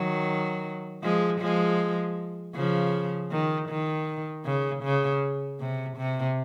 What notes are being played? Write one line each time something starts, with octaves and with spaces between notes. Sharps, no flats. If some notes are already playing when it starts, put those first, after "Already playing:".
Already playing: D#3 F#3
F3 G#3
F3 G#3
C#3 F3
D#3
D#3
C#3
C#3
C3
C3